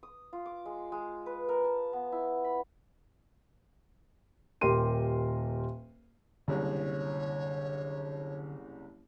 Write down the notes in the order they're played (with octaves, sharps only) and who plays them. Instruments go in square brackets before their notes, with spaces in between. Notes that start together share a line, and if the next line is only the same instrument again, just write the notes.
[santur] D#6
F4
D6
G#3
G#3
B4
A#4
A5
B3
E4
B5
[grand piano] D#1 G4 A#4 C6 D#7
[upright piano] F#1 C2 [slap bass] D3 D4 [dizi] C#5